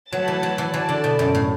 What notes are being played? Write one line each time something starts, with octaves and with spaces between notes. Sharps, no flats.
F#3 A3 F#4 B4 F#5 A5
E3
F#3
E3
E3 F#4 D5 A5
D3
B2
F#2
A2